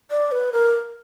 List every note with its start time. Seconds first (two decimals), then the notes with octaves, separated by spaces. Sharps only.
0.11 D5
0.32 B4
0.53 A#4